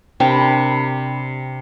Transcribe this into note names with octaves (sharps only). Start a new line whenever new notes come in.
C3 D4 G4 A#4 G5 B5